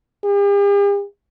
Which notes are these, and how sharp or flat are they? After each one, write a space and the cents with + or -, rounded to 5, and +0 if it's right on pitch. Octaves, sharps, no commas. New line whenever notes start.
G4 +45